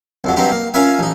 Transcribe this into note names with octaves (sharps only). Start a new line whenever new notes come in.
C2 F2 F#3
G2 F#3 C4 D#4 G4
A#3
C#4 F4 A#4 E5 G#5
A1 D#4